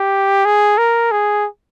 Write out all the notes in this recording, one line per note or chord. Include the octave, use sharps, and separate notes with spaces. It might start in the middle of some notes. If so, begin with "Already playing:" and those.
Already playing: G4
G#4
A#4
G#4